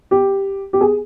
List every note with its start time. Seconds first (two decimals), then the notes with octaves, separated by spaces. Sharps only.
0.11 G4
0.73 G4
0.81 G#4